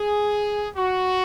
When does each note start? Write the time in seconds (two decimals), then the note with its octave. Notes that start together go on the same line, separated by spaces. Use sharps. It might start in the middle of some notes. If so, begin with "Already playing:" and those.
Already playing: G#4
0.76 F#4